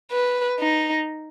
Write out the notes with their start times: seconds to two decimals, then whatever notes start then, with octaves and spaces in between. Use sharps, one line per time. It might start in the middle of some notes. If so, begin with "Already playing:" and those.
0.12 B4
0.60 D#4